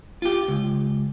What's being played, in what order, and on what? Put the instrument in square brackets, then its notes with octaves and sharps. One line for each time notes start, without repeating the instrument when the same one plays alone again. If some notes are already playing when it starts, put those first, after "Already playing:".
[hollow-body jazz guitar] F4 G4
C#2